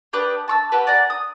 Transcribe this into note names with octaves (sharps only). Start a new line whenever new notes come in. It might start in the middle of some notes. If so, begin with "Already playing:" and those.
D4 G4 B4 D#6
A5 C#6 E6
F#4 G4 B4
D5 F#5 G#5 A#5
D#6